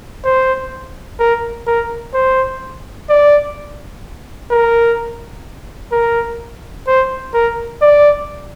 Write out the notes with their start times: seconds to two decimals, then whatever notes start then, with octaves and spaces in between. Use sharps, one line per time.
0.24 C5
1.20 A#4
1.67 A#4
2.14 C5
3.09 D5
4.51 A#4
5.92 A#4
6.87 C5
7.34 A#4
7.82 D5